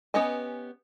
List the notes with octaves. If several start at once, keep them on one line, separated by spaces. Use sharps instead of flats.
B3 C#4 G4 D#5 G#5